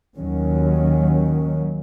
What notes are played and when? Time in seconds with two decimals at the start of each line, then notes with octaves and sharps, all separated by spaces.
0.18 D#2 D#3 F#3 C#4